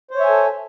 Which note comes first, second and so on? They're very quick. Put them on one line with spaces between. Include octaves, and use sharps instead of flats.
C5 C#5 E5 G#5 A4